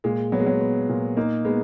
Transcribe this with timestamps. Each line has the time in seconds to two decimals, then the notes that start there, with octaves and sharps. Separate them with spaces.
0.04 A#2 G#3
0.32 F#3 B3
0.39 G#3
0.46 F#3
0.61 B3
0.89 A#2
1.17 A#3 D#4
1.45 G#3 B3